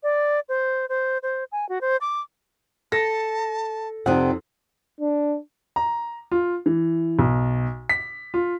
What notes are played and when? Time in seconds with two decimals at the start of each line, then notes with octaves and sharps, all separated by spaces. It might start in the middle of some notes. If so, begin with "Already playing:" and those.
0.03 D5
0.49 C5
0.89 C5
1.23 C5
1.52 G#5
1.69 F#4
1.81 C5
2.01 D6
2.92 A4 A5 A#6
4.06 F2 C3 D#4 D5 F#5
5.01 D4
5.76 A#5
6.32 F4
6.66 E3
7.19 B1
7.89 B6
8.34 F4